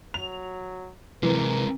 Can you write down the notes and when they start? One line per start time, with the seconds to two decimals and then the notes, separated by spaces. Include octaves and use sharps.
0.14 F#3 F7
1.23 C3 E3 G#3 A#4